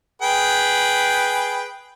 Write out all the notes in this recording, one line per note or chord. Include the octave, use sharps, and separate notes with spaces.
G#4 B4 G5